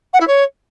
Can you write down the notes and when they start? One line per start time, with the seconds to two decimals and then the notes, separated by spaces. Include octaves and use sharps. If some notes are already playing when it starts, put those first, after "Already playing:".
0.13 F#5
0.20 E4
0.27 C#5